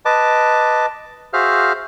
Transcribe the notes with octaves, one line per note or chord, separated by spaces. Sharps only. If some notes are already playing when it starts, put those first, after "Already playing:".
B4 D#5 A5 D6
F#4 G#4 C5 E5 F5 F6